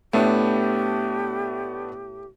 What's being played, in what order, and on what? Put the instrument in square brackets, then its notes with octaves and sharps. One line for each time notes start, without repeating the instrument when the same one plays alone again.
[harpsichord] A2 [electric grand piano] A3 B3 D4 [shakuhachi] G4